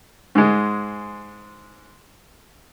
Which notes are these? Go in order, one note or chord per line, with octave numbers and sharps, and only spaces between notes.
G#2 G#3